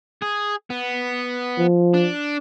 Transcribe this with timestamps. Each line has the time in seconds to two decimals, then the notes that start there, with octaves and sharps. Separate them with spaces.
0.22 G#4
0.70 B3
1.58 F3
1.94 D4